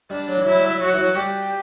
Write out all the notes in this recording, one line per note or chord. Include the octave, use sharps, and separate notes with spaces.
G3 D4
F#3
E3
F#3 E4
G3
F#3
F#3 F#4
E3
F#3
G3 G4